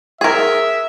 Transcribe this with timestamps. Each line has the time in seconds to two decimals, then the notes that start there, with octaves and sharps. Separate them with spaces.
0.21 G#4 A#4 E5